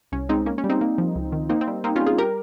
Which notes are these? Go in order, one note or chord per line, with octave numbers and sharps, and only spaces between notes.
C2 C#4
G#3 C4 D#4
A#3 C#4
C#4
G3
C4 D#4
A#3
F3
C#2
D#3
A#3 C4 D#4
C4
G3
A#3 C4 D#4
C#4 F4
G3
F4 G#4
G4 A#4